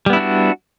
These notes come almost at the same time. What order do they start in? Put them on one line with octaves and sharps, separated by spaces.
G3 B3 E4 D4 F#4